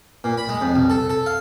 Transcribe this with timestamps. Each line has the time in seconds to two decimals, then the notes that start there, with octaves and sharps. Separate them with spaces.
0.24 A#2
0.37 B5
0.49 G#3
0.61 F2
0.75 C2
0.90 A4
1.10 A4
1.26 F5